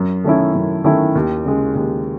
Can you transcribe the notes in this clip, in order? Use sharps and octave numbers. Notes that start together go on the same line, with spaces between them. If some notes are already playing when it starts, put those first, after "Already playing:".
Already playing: F#2
D#3 A3 C#4 E4
F#2
D#3 A3 C#4 E4
D#2
C#3 G#3
D#2